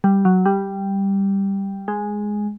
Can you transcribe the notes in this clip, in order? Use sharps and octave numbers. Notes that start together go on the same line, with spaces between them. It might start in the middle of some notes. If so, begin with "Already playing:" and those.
G3
F#3
G3
G#3